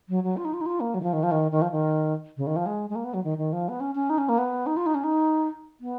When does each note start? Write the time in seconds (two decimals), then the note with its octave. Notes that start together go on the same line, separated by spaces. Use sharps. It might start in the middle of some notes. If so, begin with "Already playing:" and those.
0.09 F#3
0.23 F#3
0.37 F4
0.45 D#4
0.53 F4
0.61 D#4
0.66 F4
0.80 A#3
0.94 F#3
1.01 D#3
1.03 F3
1.13 D#3
1.23 F3
1.31 D#3
1.52 D#3
1.62 F3
1.71 D#3
2.37 C#3
2.47 D#3
2.56 F3
2.66 G#3
2.90 G#3
2.95 A#3
3.04 B3
3.14 F#3
3.24 D#3
3.38 D#3
3.53 F3
3.69 B3
3.80 C#4
3.95 C#4
4.10 D#4
4.18 C#4
4.29 A#3
4.38 B3
4.66 D#4
4.77 F4
4.86 D#4
4.95 C#4
5.04 D#4
5.81 B3